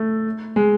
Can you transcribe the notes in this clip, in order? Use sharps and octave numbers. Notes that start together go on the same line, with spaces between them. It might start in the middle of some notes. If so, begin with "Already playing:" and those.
Already playing: A3
G#3